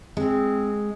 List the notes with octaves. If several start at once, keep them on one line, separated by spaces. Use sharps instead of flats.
G#3 C4